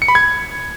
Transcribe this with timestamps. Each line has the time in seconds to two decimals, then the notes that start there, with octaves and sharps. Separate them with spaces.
0.02 C#7
0.08 B5
0.15 G#6